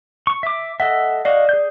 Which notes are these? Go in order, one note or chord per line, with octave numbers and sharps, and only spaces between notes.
C#6
E5 D6
A4 D#5 E5 F#5
F#4 D5 D#5 F5
G#4 G6